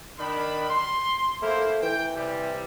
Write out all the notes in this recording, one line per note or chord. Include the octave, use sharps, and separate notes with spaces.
D#3 D4 B5
C6
A3 A#3 E4 C5
E3 G5
C3 G3